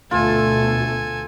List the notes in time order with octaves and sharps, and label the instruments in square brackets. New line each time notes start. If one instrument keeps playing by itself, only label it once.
[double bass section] D2 B2 [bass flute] A3 [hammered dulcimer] F4 [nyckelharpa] A4 G#5